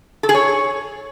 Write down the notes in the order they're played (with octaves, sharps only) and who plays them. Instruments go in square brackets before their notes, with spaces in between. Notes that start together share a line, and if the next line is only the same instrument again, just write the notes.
[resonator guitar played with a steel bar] A4
G#4
C#5